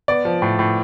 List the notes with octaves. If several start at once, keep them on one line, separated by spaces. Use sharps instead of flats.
B3 D5
F3
A2
A2